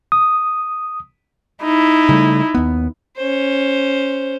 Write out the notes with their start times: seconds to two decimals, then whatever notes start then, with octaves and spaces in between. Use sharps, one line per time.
0.12 D#6
1.62 D#4 E4
2.09 C#3 G3 A3
2.55 D#2 B3
3.16 C#4 C5